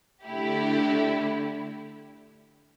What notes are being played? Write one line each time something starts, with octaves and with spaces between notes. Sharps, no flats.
D3 A3 E4 G4